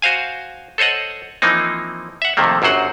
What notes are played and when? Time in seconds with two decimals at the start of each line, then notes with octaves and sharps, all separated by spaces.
0.02 F#4 C5 F5 G#5
0.78 A4 C5 C#5 D#5 F#5
1.42 E3 F3 A#3 C4 D#4
2.22 E5 F#5
2.37 F2 C3 D#3 A3 A#3
2.62 G1 F#2 F#3 C5 F#5